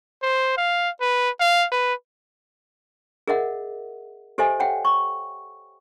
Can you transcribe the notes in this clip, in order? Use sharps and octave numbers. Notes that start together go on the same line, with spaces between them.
C5
F5
B4
F5
B4
G#4 A#4 D#5 E5 F#5
G4 A4 C5 D#5 E5 G#5
C#5 E5 F#5 G5
C#6